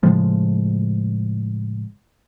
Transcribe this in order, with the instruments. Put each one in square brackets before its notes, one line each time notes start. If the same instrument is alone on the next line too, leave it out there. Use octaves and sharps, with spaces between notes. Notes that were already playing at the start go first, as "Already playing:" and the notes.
[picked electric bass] A2 C#3 F3 G#3